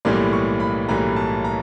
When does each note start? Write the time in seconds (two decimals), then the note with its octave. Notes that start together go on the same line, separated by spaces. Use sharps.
0.05 B1 A2 E3 G3 A#3 C6
0.33 C#6
0.60 B5
0.89 B1 A2 E3 G3 A#3 A#5
1.16 A5
1.44 A#5